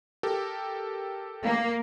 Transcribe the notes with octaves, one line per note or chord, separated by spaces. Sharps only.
G4 A4 A#4
A#3